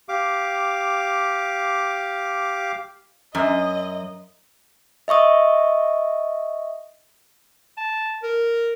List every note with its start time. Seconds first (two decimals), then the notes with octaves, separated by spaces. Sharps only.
0.09 G4 F5 D6
3.35 F#2 D#5
5.08 D#5 E5 C#6 D#6
7.77 A5
8.23 A#4